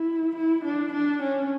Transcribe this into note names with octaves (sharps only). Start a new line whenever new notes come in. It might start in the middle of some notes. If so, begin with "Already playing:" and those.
Already playing: E4
E4
D4
D4
C#4